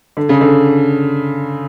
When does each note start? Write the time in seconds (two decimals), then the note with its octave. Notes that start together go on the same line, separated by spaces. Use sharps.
0.17 D3
0.29 C#3
0.41 D3